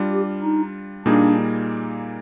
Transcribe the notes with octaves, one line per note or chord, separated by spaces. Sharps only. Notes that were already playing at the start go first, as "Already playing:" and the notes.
Already playing: G3 D4 F4
G4
D#4
A#2 G3 A#3 D4 D#4 G#4